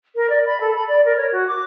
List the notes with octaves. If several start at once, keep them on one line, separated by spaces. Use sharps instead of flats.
A#4
D5
B5
A4
B5
D5
A#4
C#5
F#4
D6